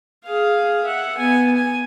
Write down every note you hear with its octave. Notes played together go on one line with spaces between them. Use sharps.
G#4 F5
E5 F#5
B3 G#5
G#5